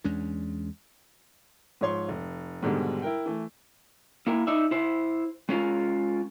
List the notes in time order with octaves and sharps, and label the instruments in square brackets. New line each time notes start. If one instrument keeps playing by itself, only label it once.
[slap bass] E2 G#3 C#4 D4
[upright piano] G#2 F3 C#5 C6
F1
G#2 B2 D3 D#3 G3 G#3
E4 A#4 G5
E3 A3
[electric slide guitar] A#3 E4 A#4
D#4 D5 E5
E4 C5
G#3 C#4 F4 A#4